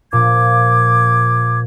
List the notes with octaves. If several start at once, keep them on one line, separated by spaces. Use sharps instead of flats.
A#2 F3 D6 G#6